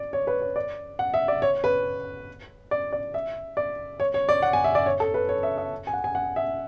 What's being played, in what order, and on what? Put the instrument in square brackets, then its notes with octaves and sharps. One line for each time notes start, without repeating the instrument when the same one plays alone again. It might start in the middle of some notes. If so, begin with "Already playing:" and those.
Already playing: [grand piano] D5
C#5
B4
C#5
D5
F#5
E5
D5
C#5
B4
D5
D5
E5
D5
C#5
C#5
D5
F#5
G#5
E5
D5
C#5
A4
B4
C#5
E5
E5
G#5
F#5
G#5
F#5
E5